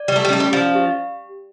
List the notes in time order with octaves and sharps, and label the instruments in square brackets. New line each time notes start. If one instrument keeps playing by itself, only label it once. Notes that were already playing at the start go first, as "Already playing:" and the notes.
Already playing: [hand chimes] D5
[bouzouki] G3 [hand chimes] G4
[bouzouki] A3
G3
[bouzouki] A3 [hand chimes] C#4
[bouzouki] G3
[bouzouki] F3 [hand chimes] F5
[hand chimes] G4